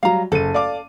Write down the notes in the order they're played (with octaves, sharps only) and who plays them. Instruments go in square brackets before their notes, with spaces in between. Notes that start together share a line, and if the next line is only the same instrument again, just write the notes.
[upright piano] F#3 G3 [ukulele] F5 A#5
[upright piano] F#1 D#7 [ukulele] A4
[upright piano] D5 F5 D6